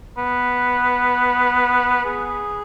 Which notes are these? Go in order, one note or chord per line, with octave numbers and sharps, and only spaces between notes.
B3
G#4